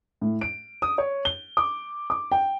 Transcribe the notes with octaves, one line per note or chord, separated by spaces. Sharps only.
A2
D7
D#6
C#5
G7
D6
D6
G5